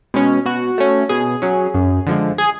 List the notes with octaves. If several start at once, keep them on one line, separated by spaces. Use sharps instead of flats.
B2 G#3 C#4
B2 F#4
A3 C#4
B2 G#4
F#3 C#4
F#2
D3 F3 G#3
G#4